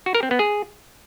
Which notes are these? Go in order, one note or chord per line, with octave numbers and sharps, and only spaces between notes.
F#4
A#4
C4
B3
G#4